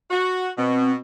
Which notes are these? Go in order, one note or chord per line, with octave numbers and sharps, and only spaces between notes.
F#4
B2 C4